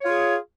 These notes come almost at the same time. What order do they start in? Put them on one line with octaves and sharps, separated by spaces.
C#5 F4 G#4